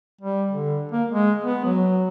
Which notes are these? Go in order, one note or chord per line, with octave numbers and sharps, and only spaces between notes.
G3
D3
A#3
G#3
B3
F#3